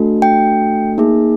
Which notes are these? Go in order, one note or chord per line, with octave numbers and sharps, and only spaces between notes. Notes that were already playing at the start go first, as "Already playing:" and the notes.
Already playing: A3 D4 F#4 A4
G5
A#3 D#4 G#4